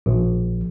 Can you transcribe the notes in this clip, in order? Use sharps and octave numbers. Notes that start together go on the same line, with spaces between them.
A#1